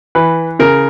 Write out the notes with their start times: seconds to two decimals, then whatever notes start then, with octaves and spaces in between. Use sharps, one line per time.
0.15 E3 B4
0.59 C#3 A#4